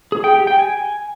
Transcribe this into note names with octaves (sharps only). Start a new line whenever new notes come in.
G#4
G5
G4
G5
G#5